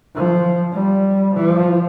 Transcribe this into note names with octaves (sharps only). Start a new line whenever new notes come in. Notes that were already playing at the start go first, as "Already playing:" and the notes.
F3
G3
F3